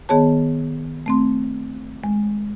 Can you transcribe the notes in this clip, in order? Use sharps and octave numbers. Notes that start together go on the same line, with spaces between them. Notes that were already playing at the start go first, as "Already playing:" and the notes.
D#3 B3 G#4 C#5 A5
A3 C4 C6
G#3